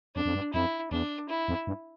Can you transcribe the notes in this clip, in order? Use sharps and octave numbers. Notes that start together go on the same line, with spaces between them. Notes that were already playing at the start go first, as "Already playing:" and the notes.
F2 D4
F2
G2
F2 E4
E2 D4
E4
F2
G2